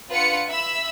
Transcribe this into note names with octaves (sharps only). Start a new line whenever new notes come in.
D4 F4 B4 F#5 C#7
E5 B5 E6